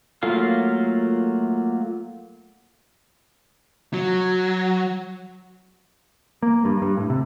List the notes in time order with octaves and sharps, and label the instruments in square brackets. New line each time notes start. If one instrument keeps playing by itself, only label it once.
[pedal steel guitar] F#3 A3 A#3 F4 F5
[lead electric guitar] F#3
[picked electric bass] A#3
G2
G2
A2
C3